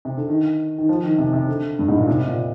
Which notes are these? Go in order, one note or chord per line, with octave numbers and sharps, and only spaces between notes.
C3
D3
D#3
D#3
F3
D#3
C3
C3
D3
G2
G#2
A#2
C3
A#2